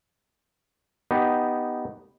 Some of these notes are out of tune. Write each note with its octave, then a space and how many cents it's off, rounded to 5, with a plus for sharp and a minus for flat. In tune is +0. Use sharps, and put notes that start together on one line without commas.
B3 +0 D#4 +0 G4 +0